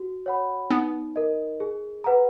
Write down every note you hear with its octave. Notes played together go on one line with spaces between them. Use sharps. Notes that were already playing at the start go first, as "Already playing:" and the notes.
Already playing: F#4
C#5 F#5 B5
B3 D#4
A#4 D#5
G#4
B4 F#5 A#5